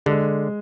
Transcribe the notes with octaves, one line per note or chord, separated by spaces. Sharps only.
D3 G#3